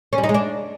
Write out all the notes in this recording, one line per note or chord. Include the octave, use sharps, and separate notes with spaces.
C#4
G3
D#4
G#3
D4